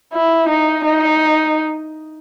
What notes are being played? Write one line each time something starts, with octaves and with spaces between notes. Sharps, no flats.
E4
D#4
D#4